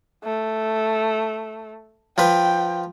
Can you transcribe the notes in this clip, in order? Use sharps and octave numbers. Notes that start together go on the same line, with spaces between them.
A3
F3 B4 G5